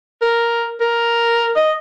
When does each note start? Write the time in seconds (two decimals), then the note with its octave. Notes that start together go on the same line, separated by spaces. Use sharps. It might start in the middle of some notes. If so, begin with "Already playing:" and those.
0.22 A#4
0.81 A#4
1.56 D#5